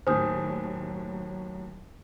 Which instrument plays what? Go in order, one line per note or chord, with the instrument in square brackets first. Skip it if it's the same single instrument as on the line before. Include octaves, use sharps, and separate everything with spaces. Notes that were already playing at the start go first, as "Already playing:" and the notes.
[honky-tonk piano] D#2 A2 [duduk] F#3 [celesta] C5 [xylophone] G#5 D#6 G6